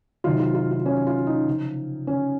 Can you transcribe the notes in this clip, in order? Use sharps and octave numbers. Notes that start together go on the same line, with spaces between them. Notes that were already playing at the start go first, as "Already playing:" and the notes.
C3 D#3 F#3 F4
F4
F4
F4
C#4
F4
D#4
C#3 F3
C#4